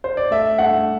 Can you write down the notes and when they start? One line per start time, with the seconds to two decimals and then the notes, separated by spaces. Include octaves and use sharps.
0.04 C5
0.17 D5
0.31 A3 E5
0.58 A3 F#5